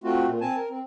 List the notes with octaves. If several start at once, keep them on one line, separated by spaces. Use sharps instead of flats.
A3 C4 F4 F#4
A#2
C4 G#5 A5
A#4
C4